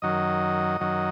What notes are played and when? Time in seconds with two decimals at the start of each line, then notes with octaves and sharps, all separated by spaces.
0.02 F#2 D#3 F#3 D#5
0.81 F#2 D#3 F#3